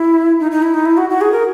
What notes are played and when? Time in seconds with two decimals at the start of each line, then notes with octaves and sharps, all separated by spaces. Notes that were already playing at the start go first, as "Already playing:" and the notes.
Already playing: E4
0.40 D#4
0.51 D#4
0.62 E4
0.74 D#4
0.85 E4
0.97 F#4
1.10 F#4
1.21 G#4
1.32 A#4